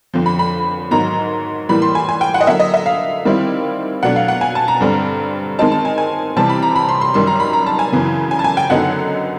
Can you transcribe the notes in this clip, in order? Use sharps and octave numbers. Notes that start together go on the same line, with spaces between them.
F2 D3 F3
B5
B5
G#2 D#3 F#3 A#5
A2 E3 G3 A#3 B5
C6
G#5
G#5
G5
F#5
D#5
D3 F#3 A#3 E5
D#5
E5
F5
D#3 G3 C4 E4
B2 F#3 A3 D4 F#5
F5
F#5
G#5
A5
A#5
G2 D3 G3 C4
D#3 G#3 C4 D#4 A5
A5
G#5
G#5
C3 E3 G3 C4 A5
B5
A#5
B5
C6
C6
F#2 D#3 G3 C6
A#5
B5
A#5
A5
G#5
F#2 C#3 E3
G#5
A5
G#5
G5
F#2 D3 F#3 B3 D#4 F#5